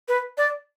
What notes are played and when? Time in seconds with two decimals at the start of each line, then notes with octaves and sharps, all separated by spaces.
0.08 B4
0.38 D5